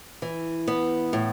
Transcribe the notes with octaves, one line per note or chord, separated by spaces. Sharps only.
E3
B3
A2